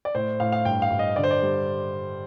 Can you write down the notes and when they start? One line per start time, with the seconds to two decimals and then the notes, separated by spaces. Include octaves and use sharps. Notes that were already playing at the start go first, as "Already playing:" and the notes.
0.05 D5
0.15 A2 C5
0.40 A2 F5
0.52 F5
0.65 G2 G5
0.82 F5
0.91 G2
0.99 D#5
1.16 D3 D5
1.24 C5
1.30 D5
1.42 G3